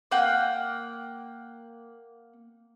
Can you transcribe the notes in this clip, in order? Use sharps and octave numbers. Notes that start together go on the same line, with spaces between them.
A#3 F#5 G5